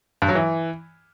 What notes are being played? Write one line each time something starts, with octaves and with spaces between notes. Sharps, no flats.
G2
F#3
E3